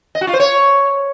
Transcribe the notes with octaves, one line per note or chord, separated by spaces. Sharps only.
D#5
F#4
F4
C5
C#5